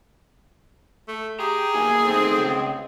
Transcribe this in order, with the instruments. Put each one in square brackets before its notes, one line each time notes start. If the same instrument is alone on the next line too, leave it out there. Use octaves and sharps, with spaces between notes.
[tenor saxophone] A3
[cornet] G4 [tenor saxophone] G#4 [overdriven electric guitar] A#5
[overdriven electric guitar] A#3 E4 [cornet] G#5
[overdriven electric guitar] D#3 A3 [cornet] C4
[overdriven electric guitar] C#2